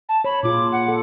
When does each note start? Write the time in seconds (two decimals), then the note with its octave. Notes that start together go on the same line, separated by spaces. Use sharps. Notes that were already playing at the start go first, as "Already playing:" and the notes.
0.08 A5
0.24 C#5 B5
0.43 A#2 F4 G#4 D6
0.72 F#5
0.88 A4